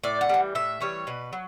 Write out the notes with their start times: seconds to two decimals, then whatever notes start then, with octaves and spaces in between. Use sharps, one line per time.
0.04 A2 D5
0.21 F#5
0.29 E3 G3
0.55 A2 E5
0.81 E3 G3 C#5
1.07 B2 B4
1.33 F#3